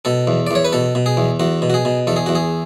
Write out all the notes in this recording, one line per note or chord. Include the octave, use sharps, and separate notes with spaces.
B2 A4
E2
D5
E2 C#5
B4
B2 A4
B2
G#4
E2
E2 F#4
B2
F#4
G#4
B2
E2 A4
G#4
E2 F#4
G#4